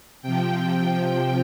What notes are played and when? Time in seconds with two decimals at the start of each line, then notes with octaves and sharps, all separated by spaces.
0.22 C3 F3 G5